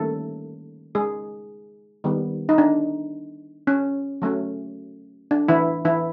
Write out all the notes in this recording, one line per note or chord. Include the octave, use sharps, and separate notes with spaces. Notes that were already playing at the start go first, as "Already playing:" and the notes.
Already playing: D#3 G3 A3 A#3 C#4 A4
G#3 G#4
D#3 G3 B3
D#4
D4
C#4
F#3 A3 C#4
D4
E3 E4
E3 E4